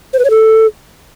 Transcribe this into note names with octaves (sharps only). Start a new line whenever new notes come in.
C5
B4
C#5
A4